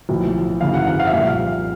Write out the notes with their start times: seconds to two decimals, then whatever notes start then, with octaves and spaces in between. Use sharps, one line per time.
0.09 B1 A2 F3
0.61 G#1 F#2 C#3 E3 F5
0.74 F#5
0.87 F#5
1.00 F5
1.07 E5
1.12 C2 A#2 F3 F5